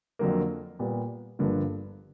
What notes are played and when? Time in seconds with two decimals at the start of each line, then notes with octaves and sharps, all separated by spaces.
0.19 F2 D3 F#3 A#3
0.79 A#2 G3 B3
1.39 G1 G2 D3 F3 A#3